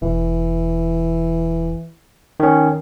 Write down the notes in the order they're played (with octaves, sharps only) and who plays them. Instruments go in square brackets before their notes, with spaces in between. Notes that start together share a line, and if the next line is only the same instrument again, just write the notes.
[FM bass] E1 [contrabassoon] E3
[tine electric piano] D#3 C#4